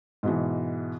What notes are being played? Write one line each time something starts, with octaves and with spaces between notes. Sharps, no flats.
G#2 B2 E3